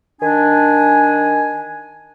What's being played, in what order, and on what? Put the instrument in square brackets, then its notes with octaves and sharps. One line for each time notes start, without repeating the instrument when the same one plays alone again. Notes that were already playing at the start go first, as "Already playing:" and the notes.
[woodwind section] D#3 D4 G#5